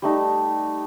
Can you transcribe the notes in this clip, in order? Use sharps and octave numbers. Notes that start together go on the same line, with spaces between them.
G3 A3 D#4